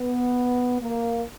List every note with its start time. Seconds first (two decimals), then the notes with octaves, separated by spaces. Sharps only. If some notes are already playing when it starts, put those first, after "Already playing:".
Already playing: B3
0.81 A#3